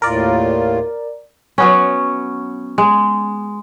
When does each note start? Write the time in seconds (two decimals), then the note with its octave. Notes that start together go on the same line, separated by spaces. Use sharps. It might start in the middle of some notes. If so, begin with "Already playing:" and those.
0.02 D#2 A2 F4 A#4 D5
1.58 F#3 B3 C#4
2.78 G#3